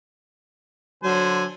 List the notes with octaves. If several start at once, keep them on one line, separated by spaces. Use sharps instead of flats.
D3 F#3 C5 G#5